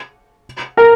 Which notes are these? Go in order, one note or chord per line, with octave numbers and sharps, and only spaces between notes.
A#4